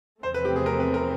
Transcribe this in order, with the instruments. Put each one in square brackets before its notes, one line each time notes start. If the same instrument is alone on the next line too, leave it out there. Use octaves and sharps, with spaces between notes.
[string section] E2 C3 F3 A3 C4 [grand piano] C5
[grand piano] B4
G4
G#4
A#4
B4
A#4